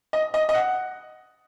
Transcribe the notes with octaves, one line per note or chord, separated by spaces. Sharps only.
D#5
D#5
D#5
F#5